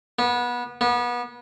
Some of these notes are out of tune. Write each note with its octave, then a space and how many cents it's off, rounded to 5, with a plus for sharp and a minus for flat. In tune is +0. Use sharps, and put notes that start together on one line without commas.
B3 -25
B3 -30